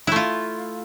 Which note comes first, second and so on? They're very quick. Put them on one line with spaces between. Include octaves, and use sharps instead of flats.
E4 A3 F4